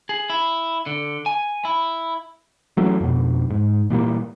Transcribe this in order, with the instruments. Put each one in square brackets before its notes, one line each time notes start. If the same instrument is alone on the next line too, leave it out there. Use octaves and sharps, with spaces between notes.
[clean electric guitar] G#4
E4
D3
G#5
E4
[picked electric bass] E3 F#3 A3 C#4
F2 B2
G#2
A#2 E3 G3 A#3